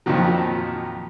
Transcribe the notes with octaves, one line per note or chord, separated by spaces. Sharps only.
F2 A#2 D#3 F3 F#3